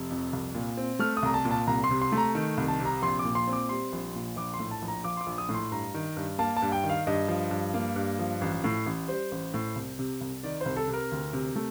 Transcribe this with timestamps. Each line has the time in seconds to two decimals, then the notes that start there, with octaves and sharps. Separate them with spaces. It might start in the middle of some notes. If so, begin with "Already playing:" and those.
Already playing: F1
0.10 F2
0.33 C2
0.55 A#2
0.77 C4
0.99 A3 F6
1.17 D#6
1.22 C2 A#5
1.34 A5
1.45 A#2
1.51 A5
1.67 C2 A#5
1.84 C6
1.90 C3
2.02 C6
2.12 A3
2.18 A#5
2.35 D#3
2.57 C2
2.68 A5
2.80 C3
2.85 A#5
3.02 A#1 C6
3.19 D6
3.25 A#2
3.35 C6
3.47 C4
3.53 D6
3.69 G3 C6
3.92 A#1
4.15 A#2
4.36 A#1 D6
4.54 C6
4.59 A2
4.71 A5
4.82 A#1
4.88 A#5
5.04 F3 D6
5.17 C6
5.21 D6
5.26 A#1
5.38 D#6
5.49 A2
5.55 C6
5.71 G2 A#5
5.94 D#3
6.16 G2
6.39 A#3 A5
6.57 A5
6.62 G2
6.72 G5
6.84 D#3
6.89 F5
7.07 G2 D#5
7.28 F3
7.51 G2
7.74 A#3
7.96 G2
8.19 F3
8.41 A1
8.64 A2
8.86 A1
9.08 G3 C5
9.31 A1
9.54 A2
9.75 C2
9.99 C3
10.21 C2
10.43 D#3 D5
10.61 C2 C5
10.77 A4
10.88 C3
10.93 A#4
11.11 D2
11.33 C3
11.56 A3